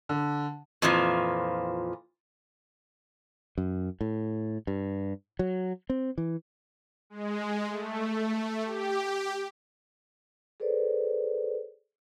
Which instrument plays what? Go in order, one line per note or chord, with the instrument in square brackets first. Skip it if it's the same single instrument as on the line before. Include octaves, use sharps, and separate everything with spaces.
[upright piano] D3
[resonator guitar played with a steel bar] F2 A#2 E3 F3
[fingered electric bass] F#2
A2
G2
F#3
C4
E3
[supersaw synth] G#3
A3
G4
[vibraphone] G#4 A4 B4 C5 D5